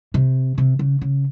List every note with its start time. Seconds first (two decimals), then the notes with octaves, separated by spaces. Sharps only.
0.14 C3
0.58 C3
0.79 C#3
1.01 C#3